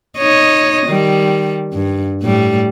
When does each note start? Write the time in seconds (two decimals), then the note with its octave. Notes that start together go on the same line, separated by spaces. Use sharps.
0.18 D#4 C#5 D#5
0.86 D#3 G3
1.73 G2
2.22 A2 G3